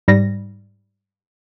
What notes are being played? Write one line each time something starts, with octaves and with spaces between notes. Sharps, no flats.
G#2 G3 A#6